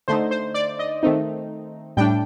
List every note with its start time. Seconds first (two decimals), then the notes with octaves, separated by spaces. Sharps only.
0.08 D3 A3 D#4 C5
0.31 C5
0.54 D5
0.79 D#5
1.03 D#3 A3 C4 D#4
1.97 A2 G3 D4 G5